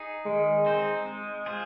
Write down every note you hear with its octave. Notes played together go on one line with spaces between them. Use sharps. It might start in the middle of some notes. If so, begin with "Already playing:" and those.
Already playing: D#4 G#4
D#3 G#3
C4 D#4 C5
G#3
F4 G#4 C5